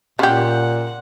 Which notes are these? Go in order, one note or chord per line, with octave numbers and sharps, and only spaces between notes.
A#2 C#3 G4 F#5